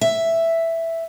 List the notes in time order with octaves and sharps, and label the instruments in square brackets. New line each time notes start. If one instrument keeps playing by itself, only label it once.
[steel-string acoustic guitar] E5